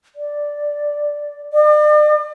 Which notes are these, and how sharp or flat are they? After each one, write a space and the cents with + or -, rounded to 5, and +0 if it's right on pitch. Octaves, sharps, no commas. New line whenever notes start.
D5 +0
D5 +40